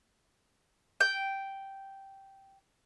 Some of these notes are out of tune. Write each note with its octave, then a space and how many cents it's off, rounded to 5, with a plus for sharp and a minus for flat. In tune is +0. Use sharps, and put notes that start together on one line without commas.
G5 -5